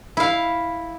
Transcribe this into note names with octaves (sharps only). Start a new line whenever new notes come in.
E4 F5